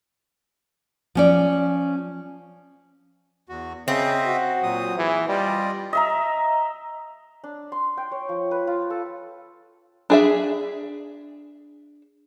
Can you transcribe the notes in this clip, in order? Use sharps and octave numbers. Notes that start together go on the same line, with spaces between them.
F3 C#4 D5
E2 F#4
C#3 C4 D#5 E5
F#4
A#2 F#3 D#6
E3 G#4
G3 F4 D5 D#5
D#5 E5 A#5
D4
C6
G5
C#5
F3
B4
F4
A4
D4 G#4 E5